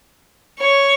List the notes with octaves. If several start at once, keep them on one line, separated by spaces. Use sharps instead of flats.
C#5